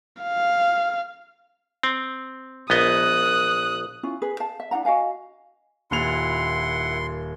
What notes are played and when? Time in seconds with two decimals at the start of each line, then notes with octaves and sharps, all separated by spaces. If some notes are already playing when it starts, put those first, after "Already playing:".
0.22 F5
1.83 C4
2.70 A#1 B3 D#5 D#6 F#6
4.03 C#4 E4 F4
4.22 G#4 B4
4.40 F5 A5
4.60 E5
4.71 D4 E4 F#5 A#5
4.85 F#4 D#5 F5 G#5
5.91 D#1 A#2 E4 F#5 C6 F7